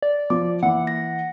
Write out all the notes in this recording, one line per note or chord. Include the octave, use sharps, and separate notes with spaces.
D5
F3 D6
E3 A#3 F#5
A#6